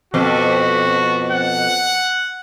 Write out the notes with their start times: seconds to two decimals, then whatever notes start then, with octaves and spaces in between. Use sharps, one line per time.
0.14 F2 B2 F#4
1.32 F#5